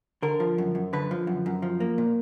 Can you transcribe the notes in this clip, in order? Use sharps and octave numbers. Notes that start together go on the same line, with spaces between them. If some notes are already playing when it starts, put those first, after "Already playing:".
D3 A#4
F3
F#2
F#2
D3 B4
F3
F#2
F#2
F3
A#3
A#2